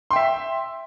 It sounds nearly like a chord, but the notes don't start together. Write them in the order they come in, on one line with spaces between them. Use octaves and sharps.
C6 G5 E5